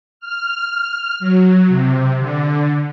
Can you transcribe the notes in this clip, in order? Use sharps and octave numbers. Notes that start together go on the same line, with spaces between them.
F6
F#3
C3
D3